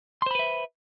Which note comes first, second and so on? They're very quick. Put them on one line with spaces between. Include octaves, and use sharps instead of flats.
C6 C5 B5 B4 E5